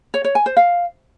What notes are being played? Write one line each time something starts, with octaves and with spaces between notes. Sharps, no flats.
C#5
C#5
G#5
C5
F5